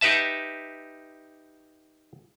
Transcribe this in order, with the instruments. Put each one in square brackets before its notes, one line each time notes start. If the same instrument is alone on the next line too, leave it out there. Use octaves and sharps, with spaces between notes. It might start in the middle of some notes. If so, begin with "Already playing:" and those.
[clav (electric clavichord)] D#4 G4 B4 E5 A5